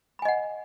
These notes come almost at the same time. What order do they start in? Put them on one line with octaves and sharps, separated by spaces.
B5 G#5 D#5 F#5